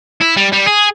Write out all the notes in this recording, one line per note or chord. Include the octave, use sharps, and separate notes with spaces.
E4
G3
G3
G#4